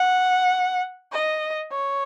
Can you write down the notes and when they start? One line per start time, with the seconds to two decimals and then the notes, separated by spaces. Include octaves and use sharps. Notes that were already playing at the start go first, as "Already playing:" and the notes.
Already playing: F#5
1.12 D#5
1.71 C#5